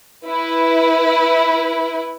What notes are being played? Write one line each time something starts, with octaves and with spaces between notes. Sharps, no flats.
E4 B4